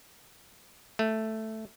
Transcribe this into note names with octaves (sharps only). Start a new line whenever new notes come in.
A3